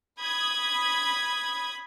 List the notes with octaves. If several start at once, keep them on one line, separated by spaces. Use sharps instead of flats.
B5 D#6 G#6